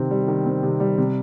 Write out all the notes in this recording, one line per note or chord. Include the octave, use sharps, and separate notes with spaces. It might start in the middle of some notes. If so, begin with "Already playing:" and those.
Already playing: C3 D#3 C4
G3
D#3
C4
C3
G3
C3